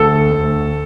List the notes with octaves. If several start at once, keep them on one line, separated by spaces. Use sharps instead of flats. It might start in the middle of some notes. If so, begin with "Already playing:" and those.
Already playing: D2 A4
D2